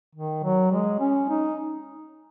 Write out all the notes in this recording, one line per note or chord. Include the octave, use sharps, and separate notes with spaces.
D#3
F#3
G#3
C#4
D#4